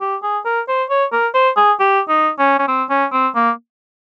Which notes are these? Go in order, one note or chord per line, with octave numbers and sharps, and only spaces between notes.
G4
G#4
A#4
C5
C#5
A#4
C5
G#4
G4
D#4
C#4
C#4
C4
C#4
C4
A#3